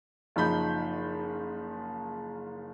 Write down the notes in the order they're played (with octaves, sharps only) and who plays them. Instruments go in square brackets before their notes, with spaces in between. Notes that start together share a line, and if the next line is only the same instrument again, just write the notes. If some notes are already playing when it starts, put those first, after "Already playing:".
[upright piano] F#1 F3 D#4 B5 G6